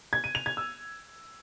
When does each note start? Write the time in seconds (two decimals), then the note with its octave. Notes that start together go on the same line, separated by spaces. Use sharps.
0.13 G#6
0.24 D#7
0.35 F7
0.46 G#6
0.57 E6